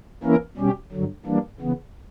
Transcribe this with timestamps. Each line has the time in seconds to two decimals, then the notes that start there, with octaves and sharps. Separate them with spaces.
0.23 E3 A#3 C#4 E4 A#4
0.57 B2 G3 C#4 G4
0.92 G2 D3 F#3
1.25 E3 G3 A#3 D4
1.60 C#3 E3 B3